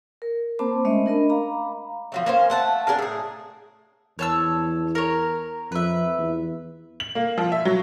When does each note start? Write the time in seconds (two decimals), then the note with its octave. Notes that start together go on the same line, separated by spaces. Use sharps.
0.22 A#4
0.59 A#3 C4 C5 A5 B5 D6
0.85 G#3 A3 C#4 D#5 E5
1.06 D4 A#4 D#5 B5
1.29 F5 A#5 B5 D6
2.12 F3 F#3 A3
2.26 A#3 C#4 C5
2.50 A3 F#5 A5
2.87 D4 G#4 A#4 F5
2.99 A2 G#4
4.19 E2 C#5 A5 E6
4.95 A#4 C#5
5.72 F2 B4 E5
6.19 E2
7.00 F#7
7.15 A#3
7.38 F3
7.52 E5
7.65 F#3